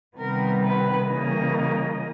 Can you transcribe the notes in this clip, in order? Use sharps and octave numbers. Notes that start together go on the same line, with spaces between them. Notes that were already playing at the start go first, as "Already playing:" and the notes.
C3 D#3 G3 B3 A#4
B4
C#3 E3 G3 A#3 D#5